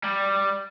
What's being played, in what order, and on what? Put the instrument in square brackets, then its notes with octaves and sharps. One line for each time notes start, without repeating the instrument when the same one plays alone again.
[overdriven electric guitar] G3